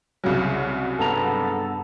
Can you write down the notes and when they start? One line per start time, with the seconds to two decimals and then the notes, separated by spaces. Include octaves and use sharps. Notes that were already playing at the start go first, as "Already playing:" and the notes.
0.24 C2 C#3 F#3
0.99 G2 B3 A4 A#5